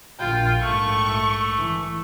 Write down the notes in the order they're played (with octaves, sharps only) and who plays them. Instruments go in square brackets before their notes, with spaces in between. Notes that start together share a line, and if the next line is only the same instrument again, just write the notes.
[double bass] A#1 [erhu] F4 [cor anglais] G5
[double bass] A#1 G#2 [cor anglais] A3 [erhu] C#6
[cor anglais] A3
[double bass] E3